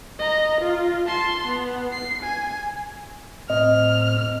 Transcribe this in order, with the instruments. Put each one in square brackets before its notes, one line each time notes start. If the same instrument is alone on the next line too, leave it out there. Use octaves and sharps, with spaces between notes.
[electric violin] D#5 A#5
F4
A5 C6
B3
C7
G#5
[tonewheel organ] A2 C4 [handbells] D#5 [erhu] F6